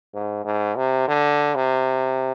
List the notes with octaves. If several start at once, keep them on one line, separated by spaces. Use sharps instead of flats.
G#2
G#2
C3
D3
C3